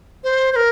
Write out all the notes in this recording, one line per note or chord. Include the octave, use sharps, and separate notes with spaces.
C5
C5
A#4